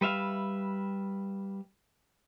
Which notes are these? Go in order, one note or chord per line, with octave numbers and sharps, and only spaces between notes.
G3 B4 E5 F5